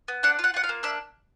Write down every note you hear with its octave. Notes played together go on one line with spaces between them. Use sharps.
B3
D4 F#5
F4
F#5
F4 F#5
F5
A#3
D4 E5